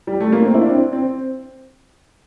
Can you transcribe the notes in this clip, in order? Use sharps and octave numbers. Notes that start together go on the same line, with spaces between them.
G3
A3
A#3
C4
E4
D4
C4
C4